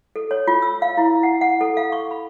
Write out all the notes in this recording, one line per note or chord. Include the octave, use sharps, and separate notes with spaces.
A4
C#5
F4
E6
F5
E4
F#5
F#5
A4
F5
C#6
B5